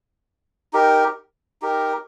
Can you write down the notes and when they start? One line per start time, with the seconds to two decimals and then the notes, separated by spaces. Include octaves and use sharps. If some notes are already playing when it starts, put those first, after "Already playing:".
0.73 D#4 G4 A#4
1.62 D#4 G4 A#4